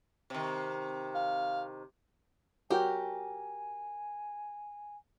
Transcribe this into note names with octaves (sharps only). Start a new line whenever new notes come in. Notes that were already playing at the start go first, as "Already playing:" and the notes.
C3 D#3
F5
F#4 G4 A#4 G5 G#5